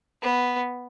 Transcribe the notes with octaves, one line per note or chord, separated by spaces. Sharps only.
B3